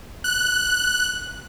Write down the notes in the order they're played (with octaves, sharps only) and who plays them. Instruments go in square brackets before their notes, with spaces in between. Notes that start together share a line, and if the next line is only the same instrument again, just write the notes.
[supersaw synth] F#6